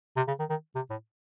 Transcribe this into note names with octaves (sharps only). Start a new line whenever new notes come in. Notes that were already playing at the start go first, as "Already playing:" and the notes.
C3
C#3
D#3
D#3
C3
A2